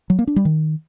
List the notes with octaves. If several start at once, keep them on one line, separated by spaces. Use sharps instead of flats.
F#3
A#3
D4
G3
D#3